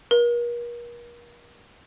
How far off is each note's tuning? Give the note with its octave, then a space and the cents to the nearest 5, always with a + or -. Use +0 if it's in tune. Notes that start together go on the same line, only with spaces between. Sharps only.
A#4 +40